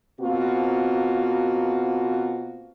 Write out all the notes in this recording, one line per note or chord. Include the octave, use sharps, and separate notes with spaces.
B2 A#3 C4 F4 F#4